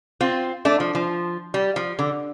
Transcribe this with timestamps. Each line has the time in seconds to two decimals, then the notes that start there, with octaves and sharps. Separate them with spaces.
0.21 C4 F4
0.65 A3 D4
0.80 F3
0.95 F3
1.54 G3
1.76 F3
1.99 D3